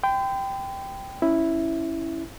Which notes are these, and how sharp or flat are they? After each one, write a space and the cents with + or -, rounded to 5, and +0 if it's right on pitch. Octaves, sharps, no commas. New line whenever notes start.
G5 +0 C6 -45
C#4 +0 E4 +0